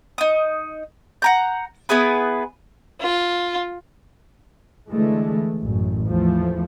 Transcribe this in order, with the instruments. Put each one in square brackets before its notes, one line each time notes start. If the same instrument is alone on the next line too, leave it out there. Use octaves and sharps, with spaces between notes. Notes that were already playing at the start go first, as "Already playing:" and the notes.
[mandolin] D#4 D#6
F#5 A#5 G6
B3 E4 G#4 B4
[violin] F4
[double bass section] D3 E3 G#3 A3
A1 F#2
E2 F3 A3